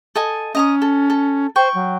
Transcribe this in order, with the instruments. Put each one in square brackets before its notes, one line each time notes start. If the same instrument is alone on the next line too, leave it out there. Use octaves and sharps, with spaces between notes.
[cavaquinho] A4 D#5 G#5
[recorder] C#4 [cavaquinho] D#5 A#5 D#6
[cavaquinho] A4
A4
[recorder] C5 [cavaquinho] G5 C#6
[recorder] F#3